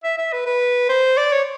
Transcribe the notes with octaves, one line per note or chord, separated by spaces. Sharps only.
E5
E5
B4
B4
C5
D5
C#5